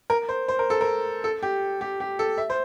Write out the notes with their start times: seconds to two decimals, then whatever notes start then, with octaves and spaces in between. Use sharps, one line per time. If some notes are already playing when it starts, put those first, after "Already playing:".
0.10 A#4
0.29 C5
0.48 C5
0.59 A#4
0.70 A4
0.81 A#4
1.24 A4
1.43 G4
1.81 G4
2.00 G4
2.19 A4
2.38 E5
2.50 C5